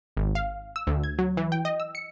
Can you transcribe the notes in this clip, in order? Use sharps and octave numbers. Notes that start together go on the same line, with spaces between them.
G#1
F5
E6
D2
G#6
F#3
E3
G5
D#5
E6
C#7